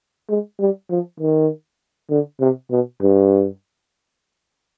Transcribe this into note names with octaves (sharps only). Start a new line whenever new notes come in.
G#3
G3
F3
D#3
D3
C3
B2
G2